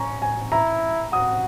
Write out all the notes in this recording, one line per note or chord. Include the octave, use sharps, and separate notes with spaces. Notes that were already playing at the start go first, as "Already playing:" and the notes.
Already playing: C#4 A#5 C#6
G#5
E4 A#5
F#4 D#6